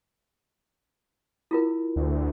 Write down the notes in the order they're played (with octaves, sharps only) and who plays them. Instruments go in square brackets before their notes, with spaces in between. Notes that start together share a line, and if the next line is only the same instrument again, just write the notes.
[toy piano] E4 F4 A#4
[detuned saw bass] D2